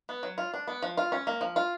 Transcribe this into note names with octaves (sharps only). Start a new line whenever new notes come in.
B3
F#3
F4
D4
B3
F3
F4
C#4
A#3
F3
F4